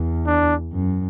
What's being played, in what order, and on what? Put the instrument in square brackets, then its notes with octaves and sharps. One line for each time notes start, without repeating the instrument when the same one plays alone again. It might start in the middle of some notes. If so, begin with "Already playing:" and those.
Already playing: [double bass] E2
[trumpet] D4
[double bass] F#2